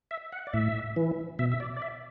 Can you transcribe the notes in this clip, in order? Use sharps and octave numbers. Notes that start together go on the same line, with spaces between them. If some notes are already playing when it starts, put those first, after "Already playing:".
E5
F#5
D5
A2 E5
E3
B2 E5
E5
D5
D5
E5